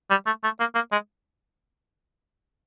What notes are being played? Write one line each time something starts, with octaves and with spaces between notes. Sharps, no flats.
G3
A3
A3
A#3
A#3
G#3